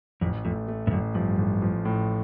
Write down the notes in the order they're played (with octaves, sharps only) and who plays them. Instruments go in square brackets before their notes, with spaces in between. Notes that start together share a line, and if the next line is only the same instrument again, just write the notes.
[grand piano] A1 [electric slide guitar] F2
[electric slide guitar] F2 [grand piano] A3
[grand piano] A3
[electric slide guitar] G2
[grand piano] A1 [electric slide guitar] F#2
[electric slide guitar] G2 [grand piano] F3
[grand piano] A1
F3
A2